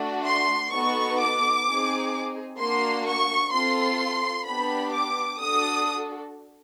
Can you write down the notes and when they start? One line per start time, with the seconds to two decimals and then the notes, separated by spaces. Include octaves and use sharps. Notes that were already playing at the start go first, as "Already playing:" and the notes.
Already playing: A3 D4 F#4
0.25 C6
0.71 B3 D#4 F#4 A4 C#6
1.19 D6
1.66 C4 D#4 G#4
2.59 A#3 D4 F#4 C6
3.06 C#6
3.52 C4 F4 A4 C6
4.46 B3 D4 G4 B5
4.93 D6
5.40 D4 F#4 A4 D#6